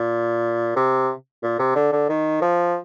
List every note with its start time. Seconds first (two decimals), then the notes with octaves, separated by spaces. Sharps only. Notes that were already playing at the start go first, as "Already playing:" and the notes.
Already playing: A#2
0.76 C3
1.43 A#2
1.59 C3
1.75 D3
1.92 D3
2.09 D#3
2.42 F3